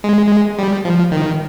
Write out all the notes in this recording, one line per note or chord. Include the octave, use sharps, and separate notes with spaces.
G#3
G3
F3
D#3